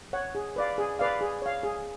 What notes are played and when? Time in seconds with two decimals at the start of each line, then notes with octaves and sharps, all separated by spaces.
0.13 C#5 F#5
0.35 G#4
0.56 B4 D5 F5
0.78 G#4
0.99 B4 D5 F5
1.21 G#4
1.42 C#5 F5
1.63 G#4